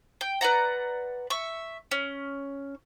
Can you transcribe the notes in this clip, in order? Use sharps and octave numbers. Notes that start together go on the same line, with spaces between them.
G5
B4 D5 F#5 A#5
E5 C#6
C#4